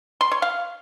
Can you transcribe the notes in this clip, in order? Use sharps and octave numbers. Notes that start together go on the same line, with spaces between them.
C6
C#5
F5